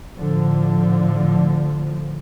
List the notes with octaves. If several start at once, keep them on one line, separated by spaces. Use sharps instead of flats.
A2 D3 F3